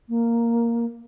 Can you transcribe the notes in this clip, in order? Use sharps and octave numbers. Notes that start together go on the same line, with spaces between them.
A#3